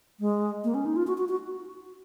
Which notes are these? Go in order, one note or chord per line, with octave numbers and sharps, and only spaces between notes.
G#3
A#3
C#4
D#4
F4
F#4
F#4
F#4